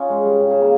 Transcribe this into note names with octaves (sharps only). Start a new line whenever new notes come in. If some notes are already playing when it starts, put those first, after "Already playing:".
Already playing: C#4 D#4 F4
G#3
G3
C#3
C#3
A#3